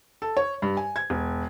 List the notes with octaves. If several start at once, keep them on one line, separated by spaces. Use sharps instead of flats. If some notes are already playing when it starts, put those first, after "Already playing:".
A4
C#5
G2
G#5
G#6
E1